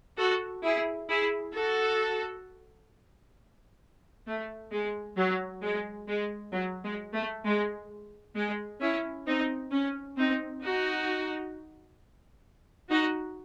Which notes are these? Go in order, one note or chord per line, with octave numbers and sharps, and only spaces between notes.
F#4 A4
E4 G#4
E4 G#4
F#4 A4
A3
G#3
F#3
G#3
G#3
F#3
G#3
A3
G#3
G#3
C#4 E4
C4 D#4
C#4
C4 D#4
D#4 F#4
D#4 F#4